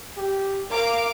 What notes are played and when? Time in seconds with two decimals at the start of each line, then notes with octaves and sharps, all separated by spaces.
0.17 G4
0.71 A#4 F5 D6